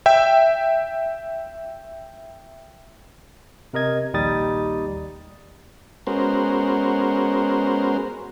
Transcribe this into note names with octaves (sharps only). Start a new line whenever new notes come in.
E5 G5
C3 A#4 D#5 G#6
A#1 D#2 G3 D#4 D#6 A6
G#3 B3 C#4 F#4 A#4 C5